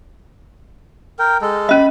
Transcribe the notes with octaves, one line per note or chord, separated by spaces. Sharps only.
A#4 G5
G#3 A4
C#4 D#5 B5